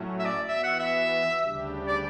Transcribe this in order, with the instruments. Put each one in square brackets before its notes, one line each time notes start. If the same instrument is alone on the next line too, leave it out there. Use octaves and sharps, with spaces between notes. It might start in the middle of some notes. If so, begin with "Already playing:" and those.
Already playing: [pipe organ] A2 F#3 A3 C#4 F#4
[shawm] E5
D5
[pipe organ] E3 B3 F#4 [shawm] E5
[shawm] F#5
E5
[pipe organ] D2 C#3 G3 D4 G4
[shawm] D5